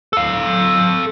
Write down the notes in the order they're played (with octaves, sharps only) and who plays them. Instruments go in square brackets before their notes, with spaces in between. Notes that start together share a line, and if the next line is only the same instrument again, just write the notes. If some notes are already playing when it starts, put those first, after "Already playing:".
[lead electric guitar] A4 F5